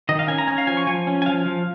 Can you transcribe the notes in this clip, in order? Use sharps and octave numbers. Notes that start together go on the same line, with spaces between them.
D#3 D#5
F5
C#4 G#5
A#5
C#4 G#5
F5
F3 G#5
C#6
F3 G#5
C#4
G#5
F3 F5
F3